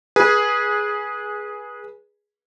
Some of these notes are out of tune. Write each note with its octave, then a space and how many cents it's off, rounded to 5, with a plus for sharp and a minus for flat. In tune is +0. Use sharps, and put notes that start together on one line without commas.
G#4 +0 B4 -25